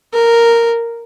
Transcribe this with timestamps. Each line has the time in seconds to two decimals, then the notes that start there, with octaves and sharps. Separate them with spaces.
0.14 A#4